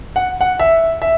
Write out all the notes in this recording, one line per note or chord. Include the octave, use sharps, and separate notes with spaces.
F#5
F#5
E5
E5